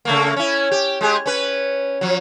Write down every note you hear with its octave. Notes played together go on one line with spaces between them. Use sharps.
C#3 A3 A#3
C#4 E4
G4
G#3 G4 G#4
C#4 B4
F3 F#3